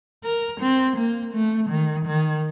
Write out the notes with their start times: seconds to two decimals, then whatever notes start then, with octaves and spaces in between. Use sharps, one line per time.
0.24 A#4
0.61 C4
0.97 A#3
1.34 A3
1.70 D#3
2.06 D#3